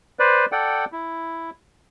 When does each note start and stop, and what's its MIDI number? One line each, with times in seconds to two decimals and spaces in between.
0.19 0.45 71
0.19 0.45 72
0.19 0.45 74
0.52 0.85 69
0.52 0.85 74
0.52 0.85 78
0.52 0.85 79
0.92 1.50 64